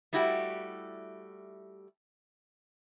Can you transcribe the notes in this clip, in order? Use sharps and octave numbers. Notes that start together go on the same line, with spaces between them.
G3 A3 E4 F#4 G4